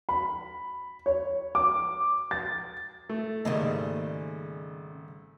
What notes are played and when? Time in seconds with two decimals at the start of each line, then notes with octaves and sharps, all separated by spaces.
0.09 B5
1.06 C#5
1.55 D6
2.31 A6
3.09 A3
3.45 G#1 C#3 G3 A3 A#3 D#5